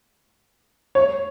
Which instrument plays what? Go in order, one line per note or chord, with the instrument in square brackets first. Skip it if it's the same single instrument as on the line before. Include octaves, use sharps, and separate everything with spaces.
[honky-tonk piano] C#5